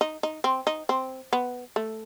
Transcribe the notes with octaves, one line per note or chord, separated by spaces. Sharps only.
D#4
D#4
C4
D#4
C4
B3
A3